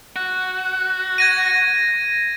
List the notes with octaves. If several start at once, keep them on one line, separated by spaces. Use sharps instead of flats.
F#4
G#6 A#6 D#7